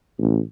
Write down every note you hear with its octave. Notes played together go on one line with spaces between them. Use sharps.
A1